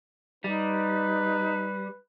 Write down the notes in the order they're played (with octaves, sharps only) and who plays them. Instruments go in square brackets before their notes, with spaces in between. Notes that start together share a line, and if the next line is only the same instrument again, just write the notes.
[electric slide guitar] G3 [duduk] D#4 [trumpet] B4